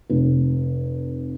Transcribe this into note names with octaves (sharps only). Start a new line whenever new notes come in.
F1